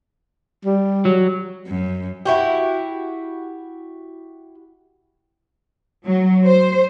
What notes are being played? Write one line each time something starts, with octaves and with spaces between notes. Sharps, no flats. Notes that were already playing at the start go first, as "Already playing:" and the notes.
G3
F#3
F#2
E4 F#4 G4
F#3
C5